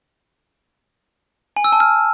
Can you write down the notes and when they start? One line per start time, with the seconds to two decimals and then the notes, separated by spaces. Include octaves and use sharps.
1.57 G#5
1.64 E6
1.72 A5
1.80 F6